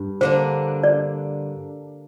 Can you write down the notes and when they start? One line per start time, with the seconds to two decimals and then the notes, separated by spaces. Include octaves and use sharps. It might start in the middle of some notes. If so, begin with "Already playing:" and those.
Already playing: G2
0.21 D3 A#3 D4 C5
0.83 D5